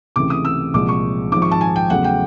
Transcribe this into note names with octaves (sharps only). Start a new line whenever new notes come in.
C#2 C3 E3 A3 D6
D#6
E6
C2 A#2 F3 G#3 D6
C#6
G#1 G#2 F3 D6
C#6
A5
G#5
G5
E2 C#3 F#3 A3 F#5
G5